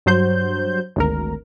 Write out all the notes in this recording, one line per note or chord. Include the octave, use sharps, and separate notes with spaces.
G2 F#3 C5 G6
G#1 D2 A#4